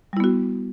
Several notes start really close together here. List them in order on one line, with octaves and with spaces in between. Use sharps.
G3 E4 B3 F#4